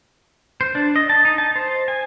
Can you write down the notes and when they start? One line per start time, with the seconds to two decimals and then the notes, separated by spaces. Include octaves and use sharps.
0.61 C5
0.75 D4
0.96 D#5
1.10 A5
1.25 D#4
1.38 A5
1.56 C5
1.88 G#5